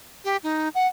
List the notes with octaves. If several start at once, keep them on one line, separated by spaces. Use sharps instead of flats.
G4
D#4
F#5